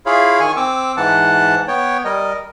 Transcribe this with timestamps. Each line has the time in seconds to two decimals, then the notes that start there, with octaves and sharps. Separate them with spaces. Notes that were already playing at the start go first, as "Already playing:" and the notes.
0.06 E4 F4 G#4 C#5 F5 B5
0.40 D#3 G#5 C#6
0.57 C4 D6 E6
0.97 G#2 E3 F#5 A5
1.68 B3 C#5 G5
2.05 G3 A#4 D#5